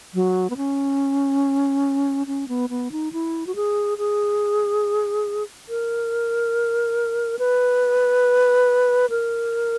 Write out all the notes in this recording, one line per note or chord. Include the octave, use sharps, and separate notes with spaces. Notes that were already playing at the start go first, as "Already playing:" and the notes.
F#3
B3
C#4
C#4
B3
B3
D#4
E4
F#4
G#4
G#4
A#4
B4
A#4